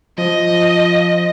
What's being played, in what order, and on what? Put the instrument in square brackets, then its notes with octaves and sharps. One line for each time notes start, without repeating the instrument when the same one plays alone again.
[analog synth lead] F3 [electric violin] D#5